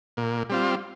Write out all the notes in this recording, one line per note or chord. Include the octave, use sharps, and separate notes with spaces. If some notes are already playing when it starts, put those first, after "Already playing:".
A#2
G3 C4 F4